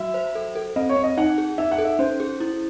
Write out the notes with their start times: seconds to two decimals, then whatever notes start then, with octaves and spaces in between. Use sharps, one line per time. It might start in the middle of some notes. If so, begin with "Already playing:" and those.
Already playing: F#3 F#4 E5
0.14 C5
0.35 A4
0.55 A4
0.76 C4 D#5
0.89 C#5
0.96 C4
1.03 D#5
1.17 D#4 F#5
1.38 G#4
1.58 D#4 E5
1.72 F#5
1.78 A4
1.85 E5
1.99 C#4 C5
2.20 G#4
2.40 E4